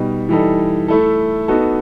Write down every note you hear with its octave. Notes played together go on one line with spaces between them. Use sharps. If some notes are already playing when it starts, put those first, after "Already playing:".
Already playing: B2 G3 D#4
E3 G3 D#4 A4
A3 E4 A4
B3 D#4 F#4 A4